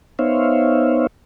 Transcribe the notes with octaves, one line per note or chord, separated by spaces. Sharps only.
B3 D#4 C5 C#5 E5 F5